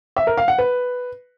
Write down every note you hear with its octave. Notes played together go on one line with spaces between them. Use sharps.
E5
A#4
F5
F#5
B4